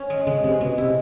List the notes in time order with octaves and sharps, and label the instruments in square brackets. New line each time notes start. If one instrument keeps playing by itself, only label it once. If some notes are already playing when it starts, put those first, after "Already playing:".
Already playing: [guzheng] C#4
G#3
[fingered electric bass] C#3 [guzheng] G#3
[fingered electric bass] C3 [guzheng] G#3
[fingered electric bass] B2 [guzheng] G#3
[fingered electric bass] C3 [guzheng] E4